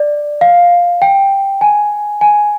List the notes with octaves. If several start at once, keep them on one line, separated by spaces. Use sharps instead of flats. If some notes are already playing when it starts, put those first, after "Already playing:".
Already playing: D5
F5
G5
G#5
G#5